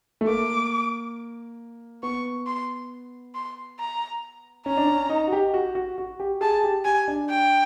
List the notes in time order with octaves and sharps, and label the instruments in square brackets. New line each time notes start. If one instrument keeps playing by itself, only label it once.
[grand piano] A3
[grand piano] A#3 [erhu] D6
[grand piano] B3 [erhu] C#6
[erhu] C6
C6
A#5
[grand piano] C#4 [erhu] A#5
[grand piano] D4
C#4
D#4
F#4
G4
F#4
F#4
F#4
G4
[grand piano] G#4 [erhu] A5
[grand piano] G4
[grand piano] G4 [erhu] G#5
[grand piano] D4
[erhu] G5